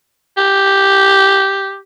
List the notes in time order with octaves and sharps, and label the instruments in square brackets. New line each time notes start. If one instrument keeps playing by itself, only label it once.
[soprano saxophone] G4